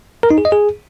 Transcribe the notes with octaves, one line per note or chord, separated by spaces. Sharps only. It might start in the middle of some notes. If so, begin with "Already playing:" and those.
A#4
D#4
G#4
D#5
G#4